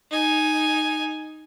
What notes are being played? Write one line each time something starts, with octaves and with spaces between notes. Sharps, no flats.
D#4 G#5